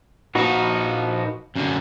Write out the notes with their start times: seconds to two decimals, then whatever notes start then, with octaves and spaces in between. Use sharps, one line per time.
0.35 A#2 F3 D#4 F#4 B4
1.56 F#2 D3